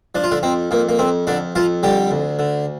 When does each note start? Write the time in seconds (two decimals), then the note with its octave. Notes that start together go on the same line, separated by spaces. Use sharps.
0.15 F3 D4
0.24 F4
0.31 D3 D4
0.43 F2 C4
0.71 F2 A#3
0.89 A#3
0.99 F2 C4
1.27 F2 D3 D4
1.56 F2 F3 F4
1.83 D3 G3 G4
2.11 D2
2.39 D3